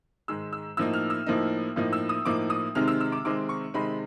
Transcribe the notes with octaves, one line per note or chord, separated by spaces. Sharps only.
G#2 D#3 G#3 E6
E6
A2 F3 A#3 D#4 E6
F6
E6
A2 F3 A#3 D#4
A2 F3 A#3 D#4
E6
D#6
A2 F3 A#3 D#4 D6
D#6
C3 D#3 G#3 C4 D#4 F6
E6
E6
D6
C3 D#3 G#3 C4 D#4 D6
C#6
C3 D#3 G#3 C4 D#4 B5